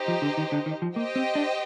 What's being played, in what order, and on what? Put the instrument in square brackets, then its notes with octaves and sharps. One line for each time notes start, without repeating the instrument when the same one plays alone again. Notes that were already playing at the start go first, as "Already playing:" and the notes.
Already playing: [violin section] D#4 G4 C5 D#5
[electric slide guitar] F3
D3
D#3
D3
D#3
F3
[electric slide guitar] A#3 [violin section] G4 C5 D#5 G5
[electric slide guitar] C4
D4